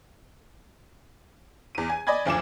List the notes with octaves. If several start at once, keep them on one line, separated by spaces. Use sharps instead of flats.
E2 D#7
G#5
D5 D#5 G#5 B5 G#6
F#1 D2 F3 D6 E7